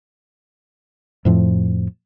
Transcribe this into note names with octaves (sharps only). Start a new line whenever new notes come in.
F2 A2 F3